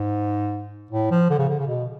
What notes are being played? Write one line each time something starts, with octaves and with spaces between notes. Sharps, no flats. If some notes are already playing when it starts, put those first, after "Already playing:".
Already playing: G#2
A2
F3
D3
C#3
D3
C#3
B2